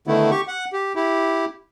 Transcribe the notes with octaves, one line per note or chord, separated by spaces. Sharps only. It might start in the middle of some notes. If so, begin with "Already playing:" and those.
D3 D#3 A3 B3 E4
G4 C#6
F#5
G4
E4 G4